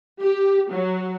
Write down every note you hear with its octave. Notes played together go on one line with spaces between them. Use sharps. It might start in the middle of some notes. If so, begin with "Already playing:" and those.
G4
F#3